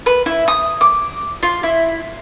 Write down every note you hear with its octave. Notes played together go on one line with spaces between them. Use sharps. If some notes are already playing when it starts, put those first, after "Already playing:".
B4
E4
D#6
D6
F4
E4